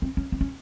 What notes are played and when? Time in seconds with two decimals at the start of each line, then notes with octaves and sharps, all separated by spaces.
0.02 C4
0.17 C#4
0.32 C4
0.41 C#4